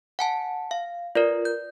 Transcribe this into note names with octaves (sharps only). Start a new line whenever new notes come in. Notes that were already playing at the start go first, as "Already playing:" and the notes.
F#5 G#5 A5
F5
F4 A#4 B4 D5
G6